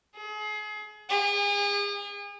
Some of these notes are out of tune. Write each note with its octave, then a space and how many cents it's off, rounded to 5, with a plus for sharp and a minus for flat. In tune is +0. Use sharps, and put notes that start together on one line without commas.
G#4 +35
G#4 -40